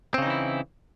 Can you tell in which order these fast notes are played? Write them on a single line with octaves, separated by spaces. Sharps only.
C4 C#3 D#4 E3 E4